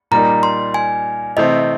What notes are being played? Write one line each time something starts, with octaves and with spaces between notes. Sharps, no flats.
A#2 G3 A#3 D#4 A#5
C6
G#5
C3 E3 A3 C4 D#5